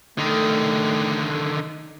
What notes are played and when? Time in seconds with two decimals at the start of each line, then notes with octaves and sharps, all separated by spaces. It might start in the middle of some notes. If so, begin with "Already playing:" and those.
0.18 D3 D#3 A3